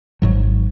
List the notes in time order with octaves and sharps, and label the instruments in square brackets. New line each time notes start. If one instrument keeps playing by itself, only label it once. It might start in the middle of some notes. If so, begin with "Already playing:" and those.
[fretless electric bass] G#1 G#2 F#3